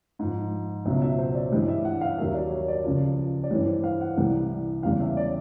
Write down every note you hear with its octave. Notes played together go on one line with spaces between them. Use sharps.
G#2 F3
C#2 B2 F#3 E5
E5
C5
D5
G2 E3 G3 D#5
E5
F#5
F5
D#2 D#3 F#3 E5
D5
C#5
D5
C#2 C#3 F3
D5
G2 E3 G3 C#5
C5
F5
F#5
C2 C3 E3 G3
E2 C#3 E3 G3 F5
E5
D5